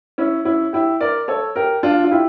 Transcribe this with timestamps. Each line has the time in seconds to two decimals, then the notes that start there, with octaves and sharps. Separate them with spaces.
0.18 C#4 E4
0.45 C#4 E4
0.73 E4 G4
1.01 A#4 D5
1.28 A4 C#5
1.56 G4 A#4
1.83 D4 F4
2.04 F4
2.11 E4 G4